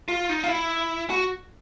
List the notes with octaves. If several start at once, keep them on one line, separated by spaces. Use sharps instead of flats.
F4
D#4
F4
E4
F#4